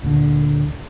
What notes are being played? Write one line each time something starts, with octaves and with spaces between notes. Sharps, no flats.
D2 A#2 D3